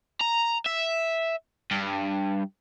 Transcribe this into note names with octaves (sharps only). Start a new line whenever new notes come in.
A#5
E5
G2